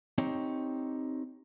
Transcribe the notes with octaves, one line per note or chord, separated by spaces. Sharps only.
C4 D#4 G4 C#5